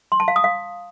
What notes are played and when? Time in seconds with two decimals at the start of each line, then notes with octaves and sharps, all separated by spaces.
0.12 C6
0.20 A5
0.28 F5
0.36 D#6
0.44 F5